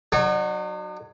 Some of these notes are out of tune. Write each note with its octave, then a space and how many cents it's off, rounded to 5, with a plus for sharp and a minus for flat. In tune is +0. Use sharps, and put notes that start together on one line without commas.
F#3 +0 D#4 -45 C#6 -30